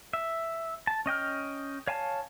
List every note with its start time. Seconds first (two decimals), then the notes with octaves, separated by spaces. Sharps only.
0.13 E5
0.87 A5
1.06 C#4 D#5 G5 F6
1.87 C#5 F5 G#5 A5